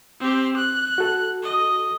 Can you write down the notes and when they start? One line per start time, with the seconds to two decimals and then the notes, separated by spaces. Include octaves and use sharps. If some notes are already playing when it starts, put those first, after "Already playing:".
0.20 C4 G4
0.57 F#6
0.98 F#4 A4
1.43 D#5